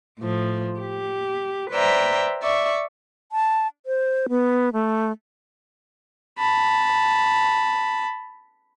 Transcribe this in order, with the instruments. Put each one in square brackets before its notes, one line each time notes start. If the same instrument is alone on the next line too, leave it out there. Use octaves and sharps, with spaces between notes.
[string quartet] A2 F3
G4
B4 C5 D5 E5 G5 A#5
D5 E5 C#6
[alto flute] A5
C5
B3
A3
[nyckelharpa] A5 B5